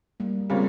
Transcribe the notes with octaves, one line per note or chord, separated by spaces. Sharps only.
G3 A#3
C#3 G3 G#3 A#3 C4 C#4 F4